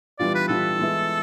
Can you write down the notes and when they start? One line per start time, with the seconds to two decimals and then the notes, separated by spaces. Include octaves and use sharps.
0.19 E3 G3 B3 D4 F4 D5
0.35 B4
0.48 E3 G3 B3 D4 F4 A4
0.79 E3 G#3 B3 E4